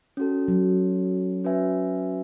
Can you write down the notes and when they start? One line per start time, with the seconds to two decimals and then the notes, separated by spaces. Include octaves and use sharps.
0.17 C#4 F#4 A4
0.48 F#3
1.44 C#4 F#4 B4 E5 G#5